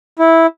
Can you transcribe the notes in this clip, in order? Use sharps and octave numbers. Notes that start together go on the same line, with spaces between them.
E4